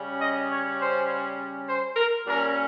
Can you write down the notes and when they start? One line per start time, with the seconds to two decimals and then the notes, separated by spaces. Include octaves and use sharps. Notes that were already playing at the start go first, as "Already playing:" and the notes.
Already playing: C#3 G3 C#4
0.19 D#5
0.49 C#5
0.78 C5
1.67 C5
1.96 A#4
2.26 A#2 G3 C#4 A#4